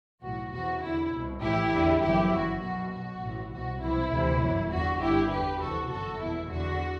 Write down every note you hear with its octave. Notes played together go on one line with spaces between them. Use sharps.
B1 A2 E3 F#4
E2 C3 E3 F#4
E2 D3 E4
C2 B2
A1 A2 E3 E4 G4
E2 D3
G1 F#2 E3 E4 G4
G1 F#2 E3 F#4
B1 B2 F#4
B1 B2 F#4
A1 A2 E3
C2 B2 F#4
C2 C3 E3 E4
D2 C3 E3
G1 F#2 E3
E2 D3 F#4
G1 G2 D3 E4 G4
E2 D3 G4 B4
D2 C3 E3 F#4 A4
G1 F#2 E3 F#4 A4
E2 B2 E4
E2 D3 F#4